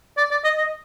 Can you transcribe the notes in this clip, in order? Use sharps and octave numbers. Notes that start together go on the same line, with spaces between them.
D5
D5
D#5
D#5